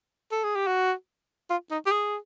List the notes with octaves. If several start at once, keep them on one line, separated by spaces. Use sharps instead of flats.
A4
G#4
G4
F#4
F4
D#4
G4
G#4